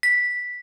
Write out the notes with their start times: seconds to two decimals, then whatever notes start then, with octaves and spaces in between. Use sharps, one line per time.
0.03 B6